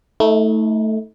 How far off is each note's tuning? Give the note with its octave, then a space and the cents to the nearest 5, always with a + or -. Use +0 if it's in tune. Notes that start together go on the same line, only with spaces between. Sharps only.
A3 +0 D#4 +40